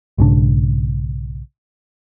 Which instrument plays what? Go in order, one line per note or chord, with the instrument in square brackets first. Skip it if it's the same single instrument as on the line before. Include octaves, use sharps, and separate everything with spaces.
[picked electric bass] B1 G#2 C#3 D4